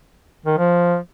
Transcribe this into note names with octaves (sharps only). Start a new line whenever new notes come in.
D#3
F3